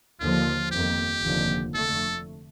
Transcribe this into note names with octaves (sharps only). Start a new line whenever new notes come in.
D#2 D3 F3 A#3 F4
G1 F2 D#3 A#3 G4
F1 D#2 D3 F3 A#3
F2 D3 A3 A4